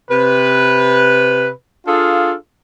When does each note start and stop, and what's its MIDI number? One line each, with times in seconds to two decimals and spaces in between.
0.10 1.50 48
0.10 1.50 71
1.87 2.34 62
1.87 2.34 65
1.87 2.34 68
1.87 2.34 69
1.87 2.34 77